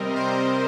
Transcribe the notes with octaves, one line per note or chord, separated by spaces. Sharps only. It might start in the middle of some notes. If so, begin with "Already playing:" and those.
Already playing: C3 G3 C4 A#4 D#5
C5